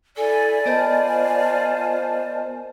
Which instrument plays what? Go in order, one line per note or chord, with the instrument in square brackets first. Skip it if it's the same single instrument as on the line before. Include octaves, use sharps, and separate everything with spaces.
[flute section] E4 G#5 [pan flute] A4 [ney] D5
[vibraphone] B3 A#4 D#5 [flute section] F4 G#5 A5 [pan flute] C5